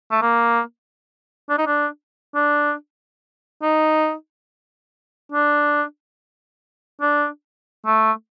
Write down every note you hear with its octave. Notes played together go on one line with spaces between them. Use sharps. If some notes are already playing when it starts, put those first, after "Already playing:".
A3
A#3
D4
D#4
D4
D4
D#4
D4
D4
A3